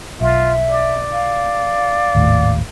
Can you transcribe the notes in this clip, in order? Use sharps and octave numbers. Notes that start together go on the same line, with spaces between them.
B1 F4 E5
D5
F5
G#1 D#2 A2